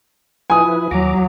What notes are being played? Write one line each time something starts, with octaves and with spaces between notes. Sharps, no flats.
F3 E4 B4 G#5 D#6
D#2 F#3 A#5 D6